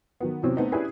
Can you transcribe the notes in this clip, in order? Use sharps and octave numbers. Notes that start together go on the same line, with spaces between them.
D#3 F#3 B3
E2 C3 F#3 C4 C#4
A3 B3 C4 D#4
C#4 D4 E4 G4 G#4 B4